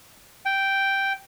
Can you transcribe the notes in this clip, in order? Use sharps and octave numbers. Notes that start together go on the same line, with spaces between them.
G5